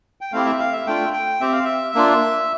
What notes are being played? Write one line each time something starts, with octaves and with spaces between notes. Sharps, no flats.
G5
A3 C4 E4 G4 F5
E5
F5
E5
A3 D4 F4 G5
G5
C4 G4 E5
F5
E5
A#3 D4 F4